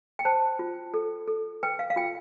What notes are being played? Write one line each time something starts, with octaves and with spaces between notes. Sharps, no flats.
G5
C5 A5
F4
A4
A4
B4 G5
F5
F5
F4 G5